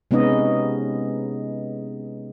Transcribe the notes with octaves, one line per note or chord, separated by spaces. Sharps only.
C3 G#3 B3 C#4 D#4 D#5